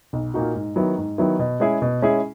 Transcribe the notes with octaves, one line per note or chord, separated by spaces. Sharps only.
B1
A#2 A#3 D#4 F#4
G#2
D#3 F#3 B3 E4
G#2
D#3 F#3 B3 E4
B2
G#3 C#4 E4 G#4
B2
G#3 C#4 E4 G#4